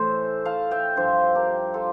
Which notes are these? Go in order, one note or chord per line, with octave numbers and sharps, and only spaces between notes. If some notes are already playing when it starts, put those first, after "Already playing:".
Already playing: A2 E3 A4 C5 E5
F5 A5
E5 G5
G2 F3 C5 E5
G4 A#4
F4 A4